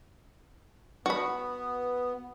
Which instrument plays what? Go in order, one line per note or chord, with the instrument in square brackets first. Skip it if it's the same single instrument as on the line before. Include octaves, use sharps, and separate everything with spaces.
[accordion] B3 [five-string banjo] F#4 B5